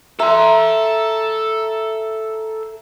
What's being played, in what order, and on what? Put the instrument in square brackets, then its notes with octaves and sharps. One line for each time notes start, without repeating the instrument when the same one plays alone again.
[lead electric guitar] A4 C6 [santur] E5 A#5